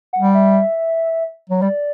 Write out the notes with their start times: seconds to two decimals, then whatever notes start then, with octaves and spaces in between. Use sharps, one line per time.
0.13 F#5
0.18 G3
0.34 E5
1.50 F#3
1.62 G3 D5